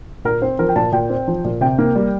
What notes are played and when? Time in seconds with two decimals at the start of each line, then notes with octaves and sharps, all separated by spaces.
0.25 A#2 A#4
0.42 C4 C5
0.59 F3 A#4
0.69 G5
0.76 A#2 A5
0.92 A#2 G5
1.09 C4
1.28 F3
1.45 A#2
1.61 C3 G5
1.78 A#3
1.95 G3